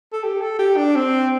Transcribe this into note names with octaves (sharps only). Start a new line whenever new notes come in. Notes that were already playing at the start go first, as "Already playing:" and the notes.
A4
G4
A4
G4
D4
C4